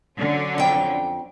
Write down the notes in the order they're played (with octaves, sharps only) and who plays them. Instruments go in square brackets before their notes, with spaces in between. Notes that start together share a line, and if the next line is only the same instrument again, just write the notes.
[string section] D3 F#3 C#4
[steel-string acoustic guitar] F2 G5